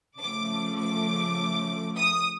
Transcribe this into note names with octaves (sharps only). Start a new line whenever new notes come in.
C#3 F3 A3 D6
D6
D#6